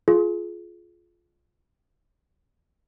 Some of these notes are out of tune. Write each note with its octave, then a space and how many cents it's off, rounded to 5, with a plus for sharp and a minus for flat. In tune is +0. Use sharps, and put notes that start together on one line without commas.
F4 +0 G#4 +30